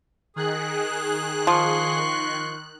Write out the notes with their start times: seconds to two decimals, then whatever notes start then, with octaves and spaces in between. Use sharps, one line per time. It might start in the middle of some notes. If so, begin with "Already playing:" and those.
0.36 D#3 G#4 F#6
1.47 F3 C6 C#6